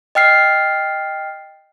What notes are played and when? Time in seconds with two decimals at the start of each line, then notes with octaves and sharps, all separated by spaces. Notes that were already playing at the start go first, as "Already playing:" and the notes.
0.15 D#5 G5 F6 C7